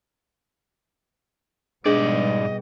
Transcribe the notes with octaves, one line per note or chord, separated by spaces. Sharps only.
G#2 B2 G3 B3 D4 G#4 D5 D#5